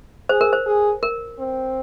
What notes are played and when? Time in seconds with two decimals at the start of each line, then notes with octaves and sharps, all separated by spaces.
0.29 G#4 C5
0.41 A#4
0.53 C5
0.66 G#4
1.03 A#4
1.39 C4